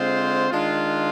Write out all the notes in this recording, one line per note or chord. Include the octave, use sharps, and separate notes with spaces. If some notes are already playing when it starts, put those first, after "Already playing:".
Already playing: D3 G#3 C4 F4 C5
D#3 G#3 D4 F4